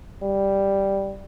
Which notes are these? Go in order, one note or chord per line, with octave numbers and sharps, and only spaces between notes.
G3